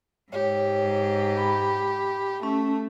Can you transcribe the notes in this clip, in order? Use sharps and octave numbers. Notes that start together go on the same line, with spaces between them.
G#2 G4 C#5
B5
A3 C#4